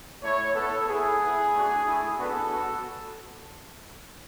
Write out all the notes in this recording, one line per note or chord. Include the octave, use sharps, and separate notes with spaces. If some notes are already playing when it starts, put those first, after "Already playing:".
A3 E4 C#5
B3 E4 A4
B3 E4 G#4
B3 E4
A3 D4 F#4
A3 E4
B3 D4 F#4 A4
B3 F#4